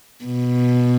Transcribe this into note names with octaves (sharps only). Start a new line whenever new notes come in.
B2